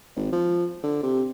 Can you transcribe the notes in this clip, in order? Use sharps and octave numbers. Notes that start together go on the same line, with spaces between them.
G#1
F3
D3
C3